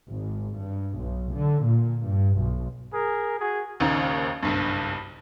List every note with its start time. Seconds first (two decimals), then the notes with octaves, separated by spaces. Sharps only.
0.11 G#1
0.57 G2
0.98 B1
1.36 D3
1.66 A#2
2.06 G2
2.39 B1
2.93 G#4 A#4
3.40 F#4 G#4
3.80 A#1 D#2 C#3 D#4
4.43 F#1 B1 G2